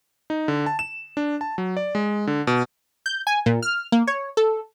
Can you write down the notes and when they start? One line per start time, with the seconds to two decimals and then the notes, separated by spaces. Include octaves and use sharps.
0.30 D#4
0.48 D3
0.66 A5
0.79 E7
1.17 D4
1.41 A5
1.58 F#3
1.77 D5
1.95 G#3
2.27 D3
2.47 B2
3.06 G6
3.27 G#5
3.46 A#2
3.62 F6
3.92 A#3
4.07 C#5
4.37 A4